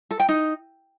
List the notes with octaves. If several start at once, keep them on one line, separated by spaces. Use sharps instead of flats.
A4
G5
D#4